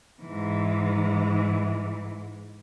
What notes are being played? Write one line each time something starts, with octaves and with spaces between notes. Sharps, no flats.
G#2 E3